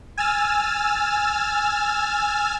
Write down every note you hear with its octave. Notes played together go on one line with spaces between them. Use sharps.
G#5 E6 F6 A6